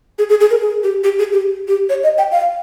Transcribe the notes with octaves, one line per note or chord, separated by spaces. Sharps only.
G#4
G#4
G#4
A#4
G#4
G4
G4
G#4
G4
G4
C#5
D#5
G5
F5